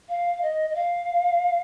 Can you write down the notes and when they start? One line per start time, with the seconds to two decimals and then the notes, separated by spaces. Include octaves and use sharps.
0.09 F5
0.42 D#5
0.70 D#5
0.75 F5